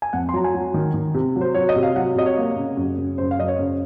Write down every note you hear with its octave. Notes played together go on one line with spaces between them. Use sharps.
G#5
F2 F#5
C6
F#3 A#5
G#5
F#3
D#3
D#3
C3
F#3
C5
F#3 C#5
D#5
C3
F5
F#3 F#5
C3 D#5
C#5
A#3
C#3
F#2
C#3
F#2 C5
F5
F#2 D#5
C#5
C#3